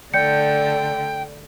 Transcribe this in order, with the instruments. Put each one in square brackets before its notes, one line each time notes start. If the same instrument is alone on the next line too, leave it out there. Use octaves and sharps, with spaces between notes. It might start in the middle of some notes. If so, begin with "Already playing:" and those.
[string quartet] D3 A3 [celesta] D5 G6 C#7 [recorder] G5